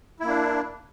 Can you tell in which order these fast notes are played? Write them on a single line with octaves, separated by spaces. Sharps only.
E4 A#3 D4